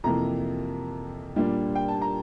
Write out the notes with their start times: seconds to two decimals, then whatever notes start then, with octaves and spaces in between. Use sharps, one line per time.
0.04 F2 C3 E3 A#3 A#5
1.36 A#2 G3 A#3 D4
1.75 G5
1.88 A5
2.02 A#5